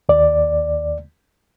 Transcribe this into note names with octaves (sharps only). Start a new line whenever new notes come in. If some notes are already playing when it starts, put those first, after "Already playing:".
D#2 D5